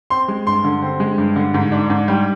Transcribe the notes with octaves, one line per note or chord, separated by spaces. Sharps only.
C4 C6
G#3
G2 C6
D3
C4
G#3
G2
D3
G#2
D4
G#2
G3